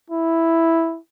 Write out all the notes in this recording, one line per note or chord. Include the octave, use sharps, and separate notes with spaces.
E4